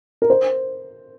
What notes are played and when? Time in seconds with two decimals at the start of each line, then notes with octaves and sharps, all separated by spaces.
0.22 A#4
0.30 C5